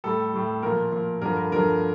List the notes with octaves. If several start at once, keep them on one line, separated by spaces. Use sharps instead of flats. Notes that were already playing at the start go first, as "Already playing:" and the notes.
A2 G3 A4
A2 G3
A#2 F3 A#4
A#2 F3
G2 D3 F3 A#4
A#4
G2 D3 F3 A#4